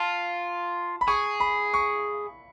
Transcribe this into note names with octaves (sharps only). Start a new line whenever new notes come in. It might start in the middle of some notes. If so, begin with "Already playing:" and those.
Already playing: F4 A5
B5
G#4 C#6
B5
C#6